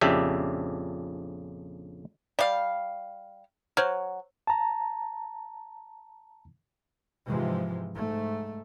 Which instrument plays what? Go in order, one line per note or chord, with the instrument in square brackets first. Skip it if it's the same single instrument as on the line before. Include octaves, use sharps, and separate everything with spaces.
[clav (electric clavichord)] A#1 F2 C#3 D4 G4 E5
[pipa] G3 F5 [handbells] D5
[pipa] F#3 [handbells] C5 C#5 F6
[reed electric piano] A5 A#5
[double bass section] G#2 C3 E3 F3 G#3
G#2 A3